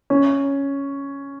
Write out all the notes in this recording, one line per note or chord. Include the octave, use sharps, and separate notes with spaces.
C#4